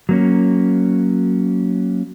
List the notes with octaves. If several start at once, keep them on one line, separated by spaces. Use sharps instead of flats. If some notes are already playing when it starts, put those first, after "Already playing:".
F#3 A#3 C#4